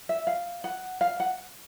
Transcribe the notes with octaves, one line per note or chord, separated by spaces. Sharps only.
E5
F5
F#5
F5
F#5